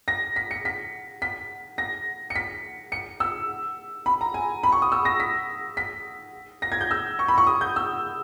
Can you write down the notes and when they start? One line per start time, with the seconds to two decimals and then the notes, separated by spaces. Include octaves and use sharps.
0.08 A#6
0.36 B6
0.51 C#7
0.65 B6
1.22 B6
1.78 A#6
2.30 C#7
2.36 B6
2.92 C#7
3.20 E6
4.06 B5
4.21 A#5
4.34 G#5
4.63 B5
4.72 C#6
4.82 D#6
4.92 E6
5.05 A#6
5.20 B6
5.77 B6
6.62 A#6
6.72 G#6
6.81 G6
6.91 E6
7.19 C#6
7.28 B5
7.38 C#6
7.47 D#6
7.61 G6
7.76 E6